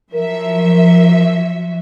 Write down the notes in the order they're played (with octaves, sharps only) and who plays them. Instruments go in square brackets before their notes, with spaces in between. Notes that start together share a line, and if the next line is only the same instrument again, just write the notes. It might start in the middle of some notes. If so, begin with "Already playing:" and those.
[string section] F3 F#3 E5 [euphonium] A#4